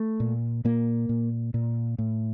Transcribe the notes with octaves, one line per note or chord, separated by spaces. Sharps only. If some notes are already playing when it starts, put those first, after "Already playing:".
Already playing: A3
A#2
A#2 A#3
A#2
A#2
A2